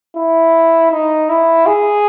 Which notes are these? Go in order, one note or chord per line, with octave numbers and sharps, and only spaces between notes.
E4
D#4
E4
G#4